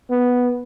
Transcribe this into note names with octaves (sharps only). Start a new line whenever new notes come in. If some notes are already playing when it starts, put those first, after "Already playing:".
B3